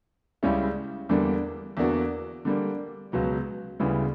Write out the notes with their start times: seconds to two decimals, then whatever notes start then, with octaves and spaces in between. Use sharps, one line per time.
0.43 C#2 C#3 G3 C#4 E4
1.09 E2 D3 G3 A#3
1.77 E2 D3 A#3 D4 F#4
2.45 D3 G3 A#3
3.12 C#2 B2 F#3 B3
3.80 D2 C#3 G3 B3 E4